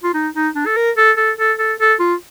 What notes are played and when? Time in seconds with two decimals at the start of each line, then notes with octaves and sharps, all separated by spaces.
0.04 F4
0.14 D#4
0.34 D#4
0.55 D4
0.66 A4
0.77 A#4
0.97 A4
1.17 A4
1.38 A4
1.59 A4
1.80 A4
2.00 F4